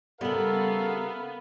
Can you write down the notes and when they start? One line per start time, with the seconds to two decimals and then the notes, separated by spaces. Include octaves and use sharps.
0.21 C#3 G3 B3 A4 A#4 E5 F5